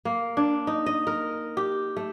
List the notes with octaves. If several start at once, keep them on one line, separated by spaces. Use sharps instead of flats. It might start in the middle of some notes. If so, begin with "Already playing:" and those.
A#3
D4
D#4
D#5
A#4
G4
A3